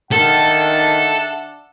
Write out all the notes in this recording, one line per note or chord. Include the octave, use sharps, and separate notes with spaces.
D#3 D4 A4 E5 F#5